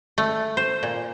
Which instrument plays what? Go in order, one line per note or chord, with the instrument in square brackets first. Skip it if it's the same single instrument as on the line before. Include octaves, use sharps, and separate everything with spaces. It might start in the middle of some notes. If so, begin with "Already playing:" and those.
[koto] A3
C5
A#2